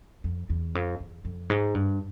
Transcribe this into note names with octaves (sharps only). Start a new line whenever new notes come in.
F2
E2
F2
E2
F2
G#2
G2